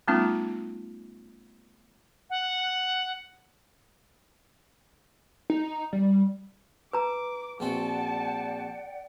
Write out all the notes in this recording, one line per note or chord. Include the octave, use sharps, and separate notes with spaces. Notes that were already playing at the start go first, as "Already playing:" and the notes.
G3 A3 B3 C#4 D#4 F4
F#5
D#4
G3
B4 A#5 D6
A#1 C4 F#4 D5 F#5 G5 A5